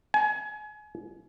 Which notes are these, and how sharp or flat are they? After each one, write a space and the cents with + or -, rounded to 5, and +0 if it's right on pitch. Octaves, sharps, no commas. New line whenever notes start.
G#5 +30